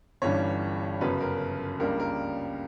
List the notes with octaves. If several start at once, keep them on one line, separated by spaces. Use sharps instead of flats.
G1 G2 E3 G3 C#4 C#5
G1 F#2 C#3 F#3 B4
A#4
C#2 C#3 G3 A#3 D4 A#4
A#4